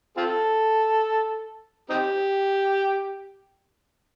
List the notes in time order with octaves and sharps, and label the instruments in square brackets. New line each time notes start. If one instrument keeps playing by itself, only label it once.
[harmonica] C4 F4 A4
C4 D#4 G4